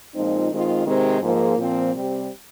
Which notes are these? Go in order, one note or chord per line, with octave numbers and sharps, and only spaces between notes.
A#2 F3 G#3 C4 D#4
D#3 G#3 C4 F4
C3 D#3 G#3 C4
G#2 F3 A#3
A#2 F3 C4
C3 G3 C4 G4